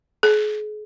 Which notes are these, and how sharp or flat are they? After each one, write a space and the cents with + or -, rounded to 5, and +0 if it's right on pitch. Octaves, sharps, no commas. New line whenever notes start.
G#4 +35